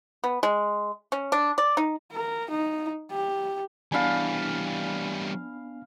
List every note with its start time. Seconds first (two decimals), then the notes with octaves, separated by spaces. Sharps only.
0.24 B3
0.43 G#3
1.12 C#4
1.32 D4
1.58 D5
1.77 D#4
2.12 A#4
2.51 D#4
3.10 G4
3.92 E3 G3 B3 D4 F5 G#5 B5